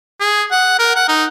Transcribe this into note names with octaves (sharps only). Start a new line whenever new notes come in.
G#4
F#5
A#4
F#5
D#4